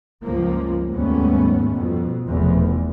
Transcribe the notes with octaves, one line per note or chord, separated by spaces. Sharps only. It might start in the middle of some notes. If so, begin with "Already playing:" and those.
C#2 G2 F3 A#3
D#2 G#2 G3 A3 B3 C#4
F2 B2
F1 E2